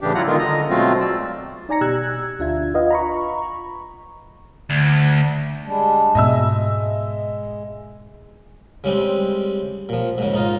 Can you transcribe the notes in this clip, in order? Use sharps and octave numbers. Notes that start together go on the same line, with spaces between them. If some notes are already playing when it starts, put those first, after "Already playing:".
A2 C#3 E3 D4 G4
F#3 E4 F4 F#5 A#5
D3 D#3 G#3 B3 F4 A#4
D3 D#5 A#5
B2 F#3 G#3 A3 C4 F4
D5 E6
D#4 D5 G#5 A#5 A#6 C#7
B2 G4 E6 F#6 G#6
D2 D4 F4 E5 G#6
F4 B4 D#5 F5 F#5
A#5 B5 C#6
D2
G3 G#3 D4
G#2 B2 G#3 D#5 E5 E6
C#3 G3 G#3 C4
A#2 F3
G#2 C#3
G#2 D#4 F4